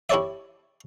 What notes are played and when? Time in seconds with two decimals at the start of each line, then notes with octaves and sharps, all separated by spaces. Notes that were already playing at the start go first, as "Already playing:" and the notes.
0.09 E4 G4 A4 C#5 D5 E5